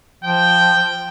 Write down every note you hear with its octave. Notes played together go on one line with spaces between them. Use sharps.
F3 G5